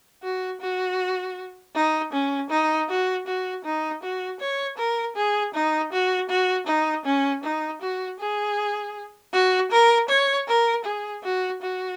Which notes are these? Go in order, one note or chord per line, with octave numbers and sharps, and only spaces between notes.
F#4
F#4
D#4
C#4
D#4
F#4
F#4
D#4
F#4
C#5
A#4
G#4
D#4
F#4
F#4
D#4
C#4
D#4
F#4
G#4
F#4
A#4
C#5
A#4
G#4
F#4
F#4